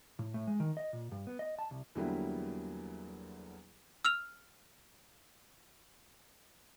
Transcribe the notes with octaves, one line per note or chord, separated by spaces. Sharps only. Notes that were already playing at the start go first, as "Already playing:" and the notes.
A2
A2
G#3
D#3
D#5
A#2
G2
B3
D#5
A5
C2
E2 D3 F#3 G3 A#3 E4
E6 F6 F7